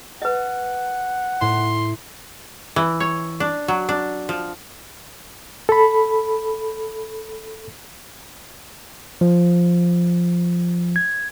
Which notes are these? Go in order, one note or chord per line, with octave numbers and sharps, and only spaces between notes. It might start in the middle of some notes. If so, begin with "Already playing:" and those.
B4 D#5 F#5
A2 C6
E3
C#5
D4
F#3
D4
F3
A4 B5
F3
G#6